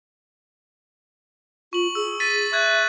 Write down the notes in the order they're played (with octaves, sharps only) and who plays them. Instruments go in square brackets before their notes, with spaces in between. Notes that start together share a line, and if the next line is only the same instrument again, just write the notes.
[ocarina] F4 [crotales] C#6 F#7
[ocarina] G#4 [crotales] E6
[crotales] A6 B6 D#7
[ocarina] E5 [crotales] C#6 F#6 G#6